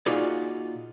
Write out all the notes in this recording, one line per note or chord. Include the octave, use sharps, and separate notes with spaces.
A#2 D#4 F4 F#4 G#4 D5